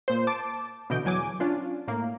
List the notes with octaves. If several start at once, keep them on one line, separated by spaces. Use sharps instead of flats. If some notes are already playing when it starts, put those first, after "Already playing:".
A#2 C5
A5 D6
B2 D3 E3 D#5 G6 D7
E2 F#3 G#5 D6
C#4 D4 F4
A2 A#3